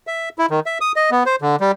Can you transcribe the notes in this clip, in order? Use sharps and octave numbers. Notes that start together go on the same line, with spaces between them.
E5
E4
D#3
E5
D#6
D#5
B3
C5
D3
G3